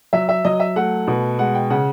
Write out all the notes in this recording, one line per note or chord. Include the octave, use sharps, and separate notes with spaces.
F#3 E5
E5
F#3 D#5
E5
A3 F#5
B2
G#3 F#5
G5
C#3 F#5